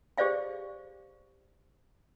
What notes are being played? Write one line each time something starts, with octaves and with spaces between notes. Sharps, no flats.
G4 G#4 C5 D5 F5 G5